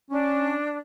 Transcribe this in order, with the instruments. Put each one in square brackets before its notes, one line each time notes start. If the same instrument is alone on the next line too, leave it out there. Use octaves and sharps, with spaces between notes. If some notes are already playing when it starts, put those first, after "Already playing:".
[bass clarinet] C#4 [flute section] D4